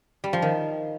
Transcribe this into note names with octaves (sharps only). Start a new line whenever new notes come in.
G3
F3
D#3